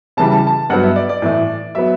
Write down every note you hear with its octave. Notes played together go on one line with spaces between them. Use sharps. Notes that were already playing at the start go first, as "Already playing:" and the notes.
C#3 E3 G3 A5
A5
A5
G2 F#3 B3 F#5
E5
D5
D5
A2 E3 A3
F#3 B3 E5